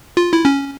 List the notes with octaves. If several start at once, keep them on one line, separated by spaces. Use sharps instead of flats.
F4
E4
C#4